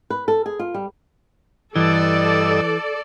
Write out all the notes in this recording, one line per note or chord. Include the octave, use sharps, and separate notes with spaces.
B4
A4
G#4
F4
G3
G2 E3 A4 D5 D#5 E6